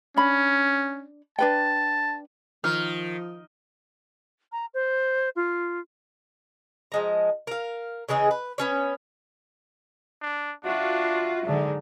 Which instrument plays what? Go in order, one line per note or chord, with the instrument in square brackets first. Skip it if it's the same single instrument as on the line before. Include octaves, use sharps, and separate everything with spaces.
[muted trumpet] C#4 [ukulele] D4 B5
[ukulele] D4 B4 G5 [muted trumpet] A5
[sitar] D#3 [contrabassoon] F3 [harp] F6
[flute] A#5
C5
F4
[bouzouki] F3 G#3 A#5
A#4 F5
C#3 E3 G#3 G#4
B4
B3 C#4 C#5
[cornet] D4
[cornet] D4 [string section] F4 F#4 [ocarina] E5
[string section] G#2 F#3 [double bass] D3 D4